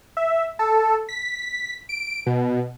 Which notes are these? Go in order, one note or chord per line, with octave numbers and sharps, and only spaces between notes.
E5
A4
B6
D7
B2